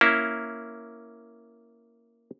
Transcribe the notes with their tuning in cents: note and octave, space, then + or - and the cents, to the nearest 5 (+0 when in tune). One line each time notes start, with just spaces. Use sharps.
A#3 +0 C#4 +0 E4 +0